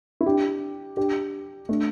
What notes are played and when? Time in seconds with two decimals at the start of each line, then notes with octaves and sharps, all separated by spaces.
0.21 E4
0.26 D4 G4
0.97 D4 G4
1.69 A3 D4